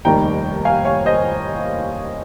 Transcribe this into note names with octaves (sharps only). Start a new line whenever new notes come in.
F1 D#2 D#3 G3 G5 A#5
F5 G#5
C#5 F5
C5 D#5